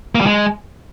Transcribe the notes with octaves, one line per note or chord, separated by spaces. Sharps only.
A#3
G3
G#3